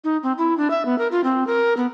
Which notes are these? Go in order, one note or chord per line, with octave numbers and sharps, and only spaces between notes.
D#4
C4
E4
D4
E5
B3
A#4
F4
C4
A#4
B3